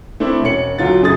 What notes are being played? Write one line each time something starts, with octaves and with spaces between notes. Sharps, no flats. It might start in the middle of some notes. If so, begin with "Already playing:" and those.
A3 C4 D4 E4
E1 C#4 C#5 C#7 F#7
D2 F#3 F4 A6
F#2 C#3 D#4 G#4 D#6 A6